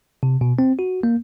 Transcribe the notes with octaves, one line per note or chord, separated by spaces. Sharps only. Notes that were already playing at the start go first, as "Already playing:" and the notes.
C3
B2
C4
F#4
A#3